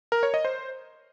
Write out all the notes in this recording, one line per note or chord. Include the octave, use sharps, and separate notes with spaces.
A#4
C#5
D#5
C5